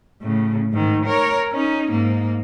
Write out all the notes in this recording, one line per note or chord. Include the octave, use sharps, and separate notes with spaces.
A2 C#3
G#2 D#3
A#4 C#5
C#4 D#4
G#2 A#3